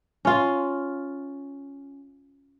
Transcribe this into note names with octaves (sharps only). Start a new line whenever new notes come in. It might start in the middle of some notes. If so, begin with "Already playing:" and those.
C#4 F4